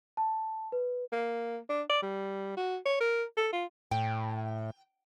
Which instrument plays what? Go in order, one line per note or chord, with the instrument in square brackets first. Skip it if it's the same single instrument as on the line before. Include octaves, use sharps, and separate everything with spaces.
[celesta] A5
B4
[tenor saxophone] A#3
D4
D5
G3
F#4
C#5
A#4
A4
F4
[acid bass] A2 [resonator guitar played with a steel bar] G5